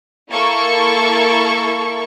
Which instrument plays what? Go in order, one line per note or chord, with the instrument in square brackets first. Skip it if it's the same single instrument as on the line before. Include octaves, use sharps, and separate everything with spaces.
[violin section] A#3 E4 A4 C#6